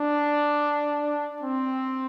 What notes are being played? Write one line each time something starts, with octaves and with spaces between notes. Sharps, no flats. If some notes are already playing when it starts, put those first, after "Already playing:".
Already playing: D4
C4